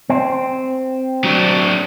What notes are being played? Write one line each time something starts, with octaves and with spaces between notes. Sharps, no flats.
C4
F#3 D4